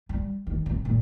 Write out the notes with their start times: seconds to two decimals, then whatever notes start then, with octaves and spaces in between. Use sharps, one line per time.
0.09 G3
0.47 D#3
0.66 C3
0.85 A#2